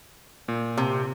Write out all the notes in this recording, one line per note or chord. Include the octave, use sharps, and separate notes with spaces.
A#2
C3